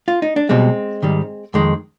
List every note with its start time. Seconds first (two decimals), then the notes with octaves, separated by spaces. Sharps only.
0.08 F4
0.22 D#4
0.36 D4
0.49 B1 B2 G3 G#3 C4
1.02 G#2 D#3 G3
1.54 F2 D#3 G#3